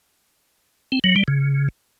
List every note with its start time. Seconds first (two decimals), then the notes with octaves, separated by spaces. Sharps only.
0.92 C4
1.04 F#3
1.16 G3
1.28 C#3